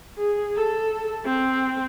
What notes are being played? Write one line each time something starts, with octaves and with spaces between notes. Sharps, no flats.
G#4
A4
C4